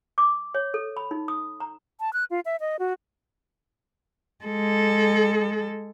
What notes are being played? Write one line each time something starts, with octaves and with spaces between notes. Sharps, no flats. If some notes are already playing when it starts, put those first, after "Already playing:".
D6
C#5
A4
B5
D#4
D#6
A#5
A5
F#6
F4
E5
D#5
F#4
G#3 A4